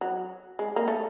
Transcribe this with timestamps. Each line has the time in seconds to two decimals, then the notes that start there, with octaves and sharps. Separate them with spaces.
0.01 F#3
0.59 G#3
0.76 A#3
0.88 A3